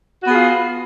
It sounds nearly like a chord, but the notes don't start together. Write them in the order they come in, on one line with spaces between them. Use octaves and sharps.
F#4 B3 G#4 F4